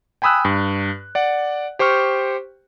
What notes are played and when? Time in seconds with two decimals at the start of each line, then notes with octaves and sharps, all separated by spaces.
0.22 G5 G#5 B5 D#6 E6 F#6
0.45 G2
1.15 D5 F#5
1.79 G4 C5 G5 C#6 F6